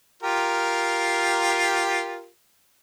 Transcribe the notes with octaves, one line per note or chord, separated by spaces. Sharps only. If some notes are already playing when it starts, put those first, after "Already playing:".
F4 G4 A#4